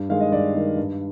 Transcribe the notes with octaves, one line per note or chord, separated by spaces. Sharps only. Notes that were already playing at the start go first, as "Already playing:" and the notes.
Already playing: G2
D#3 G#3 F5
D#5
G2 D5
D#3 G#3
G2